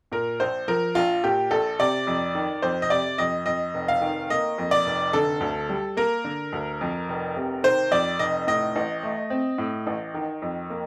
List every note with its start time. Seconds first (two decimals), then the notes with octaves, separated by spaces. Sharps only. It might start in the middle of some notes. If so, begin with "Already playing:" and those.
0.12 A#2 A#4
0.40 A#1 C5
0.68 F3 A#4
0.95 A#1 F4
1.24 A#2 G4
1.51 A#1 A4
1.79 C3 D5
2.07 F2
2.35 D#3
2.62 F2 C5
2.82 D#5
2.90 C3 D5
3.18 F2 D#5
3.46 F2 D#5
3.74 F1
3.88 F5
4.01 D#3
4.30 A#3 D#5
4.58 F2
4.71 D5
4.86 F1
5.13 D3 A4
5.41 D2
5.69 G3
5.97 A#3 A#4
6.24 D3
6.53 D2
6.81 F2
7.09 F1
7.36 C3
7.63 D#3 C5
7.91 F2 D5
8.19 F1 D#5
8.47 A2 D#5
8.76 A1
9.03 A3
9.30 C4
9.58 A2
9.87 A1
10.14 D#3
10.42 F2
10.70 A#3